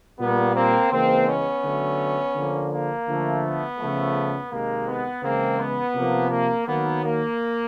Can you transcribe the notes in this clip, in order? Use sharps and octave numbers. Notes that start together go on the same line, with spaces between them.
A#2 G3 A#3 B3
A#3 C4
C#3 E3 G#3 A#3 C4
B3 C#4
D3 F#3 A3
D3 F3 A#3
A#3
D3 F3 A3
B3
C#3 F3 A3
C3 D#3 G#3 A#3
B3
C#3 E3 G#3 A#3 C4
B3
C3 F3 A#3
A#3
D#3 F#3 A#3 B3
A#3